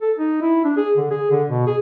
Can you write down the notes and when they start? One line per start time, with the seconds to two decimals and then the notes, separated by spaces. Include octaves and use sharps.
0.02 A4
0.18 D#4
0.42 E4
0.64 D4
0.77 G#4
0.97 D3
1.11 G#4
1.31 D3
1.50 B2
1.67 G#4